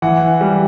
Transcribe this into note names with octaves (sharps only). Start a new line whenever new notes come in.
E3 F#5
G3